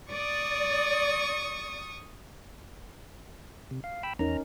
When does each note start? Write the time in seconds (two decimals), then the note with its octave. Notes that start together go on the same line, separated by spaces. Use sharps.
0.11 D5 C#6 D#6
3.71 C3
3.84 F5
4.03 G5 B5 E6
4.19 E2 C#4 D#4 A#4 A#5